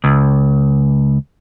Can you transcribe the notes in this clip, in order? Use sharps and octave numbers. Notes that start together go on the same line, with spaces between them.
C#2